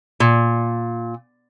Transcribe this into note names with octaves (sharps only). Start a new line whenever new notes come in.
A#2